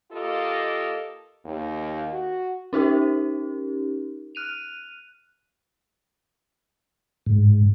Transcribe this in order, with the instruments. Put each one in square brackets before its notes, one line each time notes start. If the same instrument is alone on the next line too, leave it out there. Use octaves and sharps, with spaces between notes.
[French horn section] A#3 F4 G4 A4 A#4 D#5
[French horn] D#2
F#4
[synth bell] C#4 D#4 G4 A#4
F6 F#6 D#7 F7
[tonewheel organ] G#2